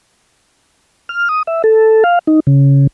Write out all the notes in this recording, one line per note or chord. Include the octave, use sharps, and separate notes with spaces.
F6
D#6
E5
A4
F5
D#4
C#3